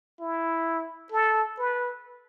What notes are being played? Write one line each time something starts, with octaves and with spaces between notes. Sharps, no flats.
E4
A4
B4